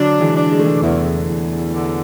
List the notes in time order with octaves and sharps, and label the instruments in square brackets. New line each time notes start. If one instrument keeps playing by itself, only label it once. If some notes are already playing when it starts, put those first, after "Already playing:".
Already playing: [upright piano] D3 F#3 [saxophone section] D4
[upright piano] E3 G#3
[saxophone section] D4
[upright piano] G#3
A3
E3 G#3
[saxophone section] E2
E2
D3